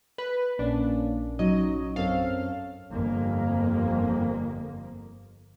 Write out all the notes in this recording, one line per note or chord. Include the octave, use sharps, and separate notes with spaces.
B4
A#1 A#3 C#4 D4
F#3 D#4 D#5
F#2 C4 A4 C#5 F5
G1 F2 A#3